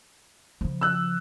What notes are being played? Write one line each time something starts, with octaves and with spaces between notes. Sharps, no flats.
C#3 F3
E6 F#6